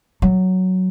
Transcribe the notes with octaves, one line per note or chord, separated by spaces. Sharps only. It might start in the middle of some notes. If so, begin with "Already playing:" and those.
F#3